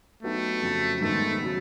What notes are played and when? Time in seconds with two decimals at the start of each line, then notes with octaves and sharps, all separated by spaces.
0.23 F#3 A3 B3 D#4 G4 B4
0.62 F2 C#3 F#3
1.01 G#2 D#3 G3 A3 B3
1.42 C#3 F#3